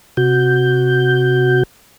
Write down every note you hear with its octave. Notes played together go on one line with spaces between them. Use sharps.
C3 F#4 G6